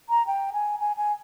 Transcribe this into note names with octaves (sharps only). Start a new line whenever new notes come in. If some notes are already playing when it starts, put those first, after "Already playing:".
A#5
G5
G#5
G#5
G#5